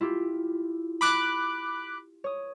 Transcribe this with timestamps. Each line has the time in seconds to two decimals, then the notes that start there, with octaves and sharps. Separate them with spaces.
0.01 E4 F4 G4
1.01 B5 D6 F#6
2.24 C#5 D#6